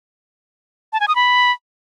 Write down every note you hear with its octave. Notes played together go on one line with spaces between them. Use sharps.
A5
G#5
D#6
B5